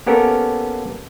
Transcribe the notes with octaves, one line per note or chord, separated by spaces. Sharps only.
A#3 B3 C#4 G4 A4 A#4